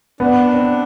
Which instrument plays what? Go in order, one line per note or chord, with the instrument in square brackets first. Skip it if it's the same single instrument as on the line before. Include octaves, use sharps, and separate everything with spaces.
[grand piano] B3 [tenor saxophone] D4
[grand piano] C4